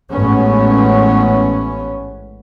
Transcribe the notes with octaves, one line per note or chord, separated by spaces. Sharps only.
A1 G#2 B3 C#4